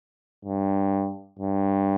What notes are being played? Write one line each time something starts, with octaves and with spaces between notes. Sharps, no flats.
G2
G2